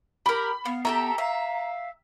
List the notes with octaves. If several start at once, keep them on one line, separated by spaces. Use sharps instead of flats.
G4 A#4 B5
B3 F5
G4 A4 E5 A#5
E5 F5